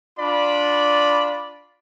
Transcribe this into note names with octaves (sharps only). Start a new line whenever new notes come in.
D4 F4 D5 B5